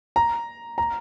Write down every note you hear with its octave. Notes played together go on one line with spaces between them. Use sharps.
A#5
A#5